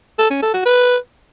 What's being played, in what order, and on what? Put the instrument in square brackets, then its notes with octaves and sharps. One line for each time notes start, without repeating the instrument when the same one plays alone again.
[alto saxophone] A4
C#4
A4
F#4
B4